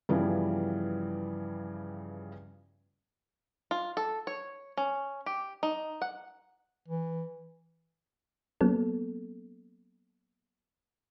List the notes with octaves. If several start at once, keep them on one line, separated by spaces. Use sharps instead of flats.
G2 C#3 E3 F3 G3 B3
F4
A4
C#5
C#4
G4
D#4
F#5
E3
F#3 A#3 B3 C#4 A4